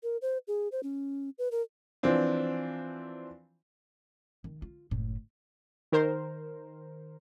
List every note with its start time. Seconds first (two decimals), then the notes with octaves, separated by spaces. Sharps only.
0.03 A#4
0.22 C5
0.48 G#4
0.72 C5
0.83 C#4
1.38 B4
1.52 A#4
2.03 E3 F3 C4 D4
4.44 D#3
4.62 F4
4.91 F#1 A2
5.92 D#3 A#4 C5